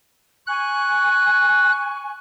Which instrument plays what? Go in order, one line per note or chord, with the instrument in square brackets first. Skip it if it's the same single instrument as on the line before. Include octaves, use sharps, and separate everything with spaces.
[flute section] G#5 C#6 [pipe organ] F#6